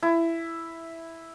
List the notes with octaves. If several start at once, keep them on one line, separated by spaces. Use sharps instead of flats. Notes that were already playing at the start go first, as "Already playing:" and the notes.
E4